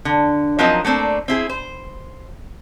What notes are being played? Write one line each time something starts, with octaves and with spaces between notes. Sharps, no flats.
D3
F3 F#3 C4 D#4 A#4 D#5
A3 A#3 C4 D4
C4 E4 G#4
C5